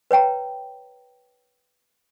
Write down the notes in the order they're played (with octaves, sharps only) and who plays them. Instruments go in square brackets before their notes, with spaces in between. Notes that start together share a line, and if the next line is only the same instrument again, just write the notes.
[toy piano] B4 C#5 G5 A#5